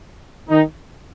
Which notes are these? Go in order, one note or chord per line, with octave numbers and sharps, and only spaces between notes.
D#3 D#4